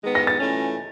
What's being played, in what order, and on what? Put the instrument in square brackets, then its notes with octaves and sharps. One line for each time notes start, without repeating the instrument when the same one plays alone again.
[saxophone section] D#3 G#3 B3
[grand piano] A#6
A6
[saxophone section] E3 A3 C#4